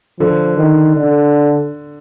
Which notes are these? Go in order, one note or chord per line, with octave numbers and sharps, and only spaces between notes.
D3 F3
D#3
D3